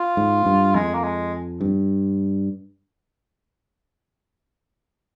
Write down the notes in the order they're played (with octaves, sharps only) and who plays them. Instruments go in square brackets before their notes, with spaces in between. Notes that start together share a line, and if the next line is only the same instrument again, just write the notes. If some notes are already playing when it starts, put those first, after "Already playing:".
Already playing: [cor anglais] F4
[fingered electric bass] G#2
G2
[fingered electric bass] F2 [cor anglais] G#3
[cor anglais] A#3
G#3
[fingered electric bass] G2